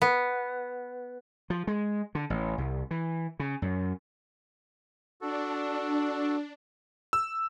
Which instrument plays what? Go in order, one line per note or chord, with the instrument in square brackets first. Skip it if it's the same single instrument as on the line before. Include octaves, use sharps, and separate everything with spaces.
[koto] B3
[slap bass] F3
G#3
D3
A1
C2
E3
C#3
F#2
[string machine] D4 [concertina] F#4 A4
[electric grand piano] E6